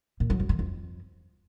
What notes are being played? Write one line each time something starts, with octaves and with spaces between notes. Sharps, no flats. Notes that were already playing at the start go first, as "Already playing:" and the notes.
A#2
F#3
F#2
D#3
F2